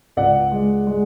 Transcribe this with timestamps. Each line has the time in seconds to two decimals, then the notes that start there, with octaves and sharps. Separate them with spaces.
0.17 C#2 D5 F#5
0.52 G#3
0.87 G#3